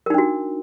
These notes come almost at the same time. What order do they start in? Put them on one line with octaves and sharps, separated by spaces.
A#4 D#4 D4 F#4